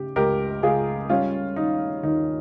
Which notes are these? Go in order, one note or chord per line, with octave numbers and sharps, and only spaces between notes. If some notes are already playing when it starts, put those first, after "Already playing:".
Already playing: C#3 G4
C#2 G4 A#4
C#2 F4 G#4
G3 C#4 F4
D#3 D#4
D#2 D#4